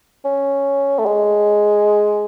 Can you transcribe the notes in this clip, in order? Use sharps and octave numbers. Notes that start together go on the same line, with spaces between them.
C#4
A3
G#3